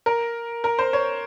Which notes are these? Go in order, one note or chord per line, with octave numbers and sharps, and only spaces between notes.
A#4
A#4
C5
C#5